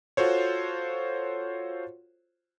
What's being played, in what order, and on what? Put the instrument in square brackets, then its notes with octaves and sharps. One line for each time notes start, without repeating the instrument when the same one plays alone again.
[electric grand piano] F4 F#4 A4 C5 C#5